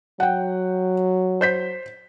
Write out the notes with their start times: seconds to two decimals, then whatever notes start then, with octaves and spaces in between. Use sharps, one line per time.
0.20 F#3 F#5 G5
1.41 C5 G6 B6